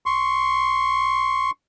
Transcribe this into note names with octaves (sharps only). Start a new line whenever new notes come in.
C6 C#6